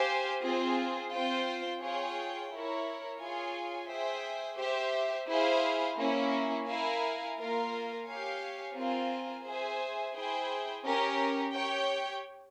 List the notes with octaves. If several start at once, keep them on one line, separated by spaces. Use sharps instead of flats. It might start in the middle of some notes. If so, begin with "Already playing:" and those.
Already playing: G4 C5 F5 G#5
C4 F4 G#4
C4 F4 C5 G5
F4 G#4 C#5 G5
E4 A#4 C#5
F4 G#4 C#5 F5 G#5
G#4 C5 E5 G5
G4 C5 E5
E4 G#4 C5 F5
A#3 C#4 E4
E4 A#4 F5 G#5
A#3 F4 A#4 F5
G4 C#5 F5 G#5
C4 F4 A#4 F5 G#5
G#4 C5 E5 G#5
E4 G#4 C5 G5
C#4 G4 A#4
G4 C#5 G5